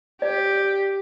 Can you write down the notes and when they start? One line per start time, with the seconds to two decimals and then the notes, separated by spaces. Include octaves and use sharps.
0.22 G4 D5